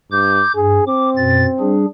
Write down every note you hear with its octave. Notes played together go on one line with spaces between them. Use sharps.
G2 D6 G6
G2 G#4
C4 D6
F#2 B2 A6
G3 D4 G#4